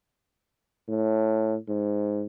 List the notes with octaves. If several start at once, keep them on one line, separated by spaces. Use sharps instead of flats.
A2
G#2